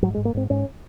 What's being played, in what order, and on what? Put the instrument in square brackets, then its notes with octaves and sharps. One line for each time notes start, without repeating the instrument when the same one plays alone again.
[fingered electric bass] G#2 F#3
G#3
G#2
A#3
G#2 C4
G#2 C#4